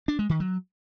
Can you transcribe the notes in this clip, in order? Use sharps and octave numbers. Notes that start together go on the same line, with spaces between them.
D4
G#3
D#3
F#3